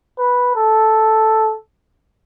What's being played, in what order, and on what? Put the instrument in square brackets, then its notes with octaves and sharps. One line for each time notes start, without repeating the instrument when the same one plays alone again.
[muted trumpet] B4
A4